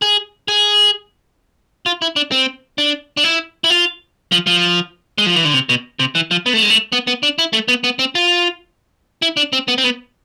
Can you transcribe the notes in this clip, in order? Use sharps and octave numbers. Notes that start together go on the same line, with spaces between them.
G#4
G#4
F4
E4
D4
C4
D4
D4
E4
E4
F4
F3
F3
G#3
F3
E3
D3
C3
B2
C3
E3
F3
B3
A3
G#3
A3
B3
B3
D4
E4
A3
B3
B3
C4
F4
E4
D4
C4
B3
C4
B3